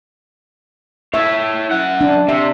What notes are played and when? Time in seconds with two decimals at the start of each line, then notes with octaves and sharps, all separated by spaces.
1.14 E4 C#5 E5
1.71 F#2 F#5
2.01 D4
2.29 C3 E5